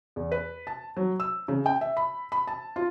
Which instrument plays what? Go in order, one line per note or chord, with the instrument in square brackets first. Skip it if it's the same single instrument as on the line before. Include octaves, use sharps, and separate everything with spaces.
[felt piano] E2
B4
A5
F#3
E6
C#3
G5
E5
B5
B5
A5
F4